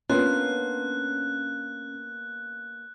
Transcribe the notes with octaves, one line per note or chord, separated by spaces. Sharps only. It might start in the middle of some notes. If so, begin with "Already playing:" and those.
A#3 B3 C#4 D4 F4 F#6